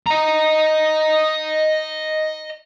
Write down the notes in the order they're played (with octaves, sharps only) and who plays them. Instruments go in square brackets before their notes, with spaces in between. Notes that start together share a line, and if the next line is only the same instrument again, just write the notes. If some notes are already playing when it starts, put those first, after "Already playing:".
[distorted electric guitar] D#5 A#5